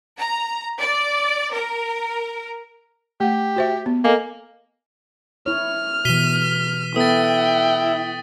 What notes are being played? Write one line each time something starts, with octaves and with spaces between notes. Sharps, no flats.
A#5
D5
A#4
A3 G4 F#5
F#4 C5 E5
B3
A#3 A4 D#5 G#5
E4 C#5 F6
B2 E3 B6 D#7 G7
B3 E4 A4 B4 G5 D#6 A6